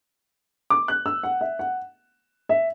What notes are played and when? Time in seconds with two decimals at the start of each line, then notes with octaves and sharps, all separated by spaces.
0.70 D6
0.88 F#6
1.06 E6
1.23 F#5
1.41 E5
1.59 F#5
2.49 E5